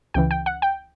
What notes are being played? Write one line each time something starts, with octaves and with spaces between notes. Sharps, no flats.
C#2 C#3 E3 G5
G5
F#5
G5